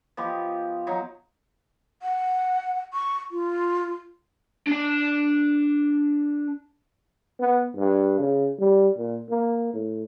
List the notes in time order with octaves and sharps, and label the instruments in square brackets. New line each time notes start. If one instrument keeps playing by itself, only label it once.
[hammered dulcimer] F3 B3 G4 D#5
F#3 D#4
[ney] F#5
C#6
F4
[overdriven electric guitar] D4 A5
[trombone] B3
G2
C#3
G3
A#2
A#3
A2